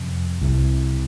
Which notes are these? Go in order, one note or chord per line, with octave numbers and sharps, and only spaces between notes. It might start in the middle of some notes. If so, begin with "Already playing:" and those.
Already playing: F2 C3
C2 C3